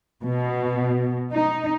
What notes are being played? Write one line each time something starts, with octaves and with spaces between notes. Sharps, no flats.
B2
D#4